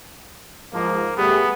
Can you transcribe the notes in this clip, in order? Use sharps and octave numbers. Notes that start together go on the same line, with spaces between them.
G#2 F3 A#3
G3 A3 B3 G#4